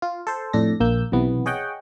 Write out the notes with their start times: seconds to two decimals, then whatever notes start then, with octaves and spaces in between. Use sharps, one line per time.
0.02 F4
0.27 A4 C5
0.53 F2 A2 D4 A4 A#6
0.80 A#1 A#3 E6 G6
1.12 B1 C3 E3 B3
1.46 G#4 C#5 D#5 F#5 G5